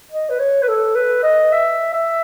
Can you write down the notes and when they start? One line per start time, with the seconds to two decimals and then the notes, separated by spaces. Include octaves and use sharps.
0.11 D#5
0.29 B4
0.39 C#5
0.62 B4
0.68 A4
0.95 B4
1.23 D#5
1.52 E5
1.93 E5